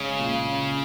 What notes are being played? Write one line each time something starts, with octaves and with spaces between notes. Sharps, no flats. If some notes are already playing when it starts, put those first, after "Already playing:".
Already playing: C#3 G#3 C#4
A#2